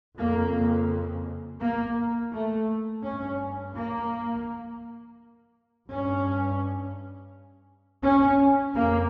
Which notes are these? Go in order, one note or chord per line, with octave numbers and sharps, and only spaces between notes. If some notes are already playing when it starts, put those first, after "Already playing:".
F2 C#3 A#3
A#3
A3
G2 C#4
A#3
G2 C#4
C#4
F2 C#3 A#3